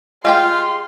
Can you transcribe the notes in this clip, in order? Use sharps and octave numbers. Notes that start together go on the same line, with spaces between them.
G#3 F4 G4 G5 C6